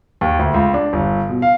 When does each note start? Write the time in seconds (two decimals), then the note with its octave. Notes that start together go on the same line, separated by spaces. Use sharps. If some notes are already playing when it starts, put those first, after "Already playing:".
0.21 D#2
0.39 D2
0.54 C#2
0.74 D4
0.93 G1
1.29 B2
1.42 F5